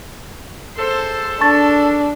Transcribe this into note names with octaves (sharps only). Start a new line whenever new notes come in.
G#4 A4 C5
D4 A5 C#6 A6